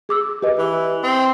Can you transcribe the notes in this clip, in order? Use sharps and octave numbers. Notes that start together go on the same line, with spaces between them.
G#4 D6 E6
G4 B4 D#5
E3
C4